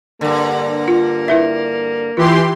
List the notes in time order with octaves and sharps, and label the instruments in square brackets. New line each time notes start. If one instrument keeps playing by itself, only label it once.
[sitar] G2 D3 [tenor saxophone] A#3
[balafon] F4
E4 B4 E5
[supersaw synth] E3 G4 C6 [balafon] F4